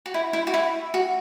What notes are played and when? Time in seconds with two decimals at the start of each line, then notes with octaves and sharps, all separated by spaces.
0.06 F#4
0.14 E4
0.33 E4
0.47 F#4
0.54 E4
0.94 F#4